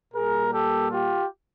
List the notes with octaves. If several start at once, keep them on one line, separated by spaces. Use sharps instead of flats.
A#2 G3 A#3 G#4 A#4
G4 A4
F4 G4